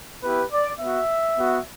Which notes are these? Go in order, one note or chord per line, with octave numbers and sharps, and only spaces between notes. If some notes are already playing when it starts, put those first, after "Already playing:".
B3 E4 G4 B4
D5
B3 F#4 E5
B3 F#4